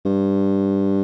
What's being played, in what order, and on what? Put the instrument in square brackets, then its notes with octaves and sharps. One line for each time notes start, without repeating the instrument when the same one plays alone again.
[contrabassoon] G2